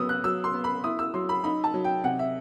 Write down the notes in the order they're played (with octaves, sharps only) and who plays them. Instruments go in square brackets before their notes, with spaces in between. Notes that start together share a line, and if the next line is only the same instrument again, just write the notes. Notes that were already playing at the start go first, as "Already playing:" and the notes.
Already playing: [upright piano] F#3 B3 D#6 E6
F#6
F#3 E6
C6
B3
B5
E4 D#6
E6
F#3 C6
B5
D#4 B5
A5
F#3
G5
C3 F#5
E5